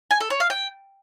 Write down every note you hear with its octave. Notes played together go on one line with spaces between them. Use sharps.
G#5
A4
C#5
F5
G5